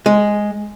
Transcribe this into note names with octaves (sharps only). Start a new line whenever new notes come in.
G#3